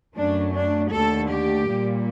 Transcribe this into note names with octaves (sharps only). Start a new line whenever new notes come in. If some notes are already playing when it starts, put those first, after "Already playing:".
F#2 F#3 A3 D4
D4
D#2 D3 A3 A4
G4
A#2 G3 A#3